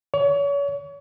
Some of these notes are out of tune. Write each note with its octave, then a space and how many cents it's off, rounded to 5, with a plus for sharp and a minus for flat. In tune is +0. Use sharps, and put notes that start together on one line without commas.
C#5 +35